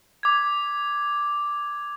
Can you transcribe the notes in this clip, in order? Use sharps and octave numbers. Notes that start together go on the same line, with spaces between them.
D6 G#6